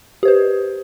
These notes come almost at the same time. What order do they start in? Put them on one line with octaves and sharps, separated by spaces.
G4 C5 B4